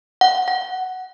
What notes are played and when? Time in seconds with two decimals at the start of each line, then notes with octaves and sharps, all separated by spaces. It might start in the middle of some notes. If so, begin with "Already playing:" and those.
0.21 F#5
0.48 F#5